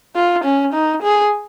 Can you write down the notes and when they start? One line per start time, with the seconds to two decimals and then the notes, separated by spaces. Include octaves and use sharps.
0.16 F4
0.45 C#4
0.74 D#4
1.03 G#4